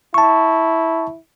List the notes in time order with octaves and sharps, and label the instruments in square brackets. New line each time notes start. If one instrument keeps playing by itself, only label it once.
[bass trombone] E4 [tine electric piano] A5 C#6